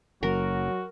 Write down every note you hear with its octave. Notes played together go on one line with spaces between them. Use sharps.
F#1 F#3 F#4 A#4